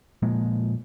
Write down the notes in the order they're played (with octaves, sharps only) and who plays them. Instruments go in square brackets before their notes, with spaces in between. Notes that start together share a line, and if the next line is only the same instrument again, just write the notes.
[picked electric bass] A#2 F3 G#3 A#3